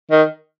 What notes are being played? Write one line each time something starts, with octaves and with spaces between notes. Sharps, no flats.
D#3